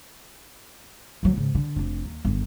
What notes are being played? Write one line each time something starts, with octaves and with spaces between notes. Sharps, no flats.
D2 F#3
G#2 C#3
D3
F1 D4
D#2
G1 D#3